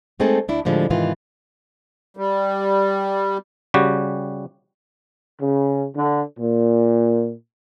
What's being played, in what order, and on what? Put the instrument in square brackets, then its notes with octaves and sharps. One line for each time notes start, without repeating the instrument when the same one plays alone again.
[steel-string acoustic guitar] G#3 A3 C4 D#4 G#4 A4
D2 D4 E4
A2 D3 F3 G3 G#3
G#2 C3 D#3 E3 F4
[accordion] G3
[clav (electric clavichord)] C#3 G3 F#4 G4
[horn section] C#3
D3
A#2